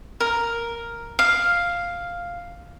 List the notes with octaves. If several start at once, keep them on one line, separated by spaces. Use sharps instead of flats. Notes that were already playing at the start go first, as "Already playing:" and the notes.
A#4
F5